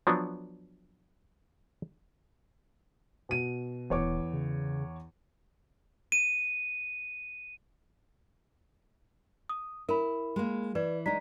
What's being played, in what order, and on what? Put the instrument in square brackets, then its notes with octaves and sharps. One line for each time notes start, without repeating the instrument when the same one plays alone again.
[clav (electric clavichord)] F3 F#3 B3 D4
[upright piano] B2 D#7
[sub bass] D#1 [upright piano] E2 C#5 D6
[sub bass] C#3
[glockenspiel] D#7
[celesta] D#6
[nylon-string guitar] E4 [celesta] A#4 B5
[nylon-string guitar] G#3 A#3
[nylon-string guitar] E3 [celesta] B4 D5
[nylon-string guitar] G#3 D#4 [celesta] D5 A#5 B6